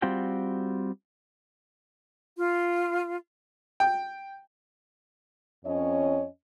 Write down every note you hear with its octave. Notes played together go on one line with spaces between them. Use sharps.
G3 C4 F4 F#4 G5
F4
G5
F2 C#4 C#5 D#5